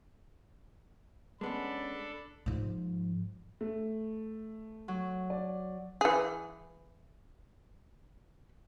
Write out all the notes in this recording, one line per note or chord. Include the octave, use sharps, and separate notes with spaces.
G#3 B3 C#4 D4 A4 B5
G#2 F3
A3
F#3
D5
E3 G#4